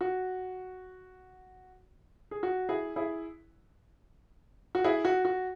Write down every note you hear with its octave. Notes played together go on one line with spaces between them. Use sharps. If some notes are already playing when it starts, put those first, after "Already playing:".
F#4
G#4
F#4
E4 G#4
E4 G#4
F#4
E4 G#4
F#4
F#4